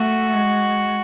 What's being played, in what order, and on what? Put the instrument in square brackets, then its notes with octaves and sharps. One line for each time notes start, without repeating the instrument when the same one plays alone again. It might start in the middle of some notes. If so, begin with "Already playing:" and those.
Already playing: [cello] A3 [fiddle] F#4
[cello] G#3